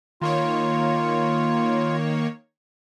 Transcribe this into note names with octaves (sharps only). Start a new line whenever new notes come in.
D#3 A#3 F4 C#5